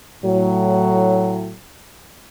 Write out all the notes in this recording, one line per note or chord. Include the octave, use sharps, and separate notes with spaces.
A2 F#3